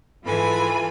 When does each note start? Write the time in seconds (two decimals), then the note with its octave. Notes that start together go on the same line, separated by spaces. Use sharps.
0.24 G#2 E3 F4 A4 G#5 B5